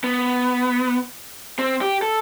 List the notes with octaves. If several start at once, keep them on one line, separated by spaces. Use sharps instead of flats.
B3
C4
G4
A4